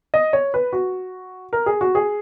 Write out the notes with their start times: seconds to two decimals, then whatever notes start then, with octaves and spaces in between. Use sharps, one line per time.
0.14 D#5
0.33 C#5
0.54 B4
0.73 F#4
1.53 A#4
1.66 G#4
1.81 F#4
1.95 G#4